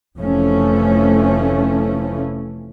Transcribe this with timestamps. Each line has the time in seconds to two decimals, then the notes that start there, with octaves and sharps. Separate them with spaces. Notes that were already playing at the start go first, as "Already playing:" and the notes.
0.17 F1 E3 F3 A3 C#4